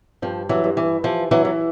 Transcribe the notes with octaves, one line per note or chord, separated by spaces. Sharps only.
G2 F3
E3 F#3
G2
E3
E3 F3
E3 F#3
E3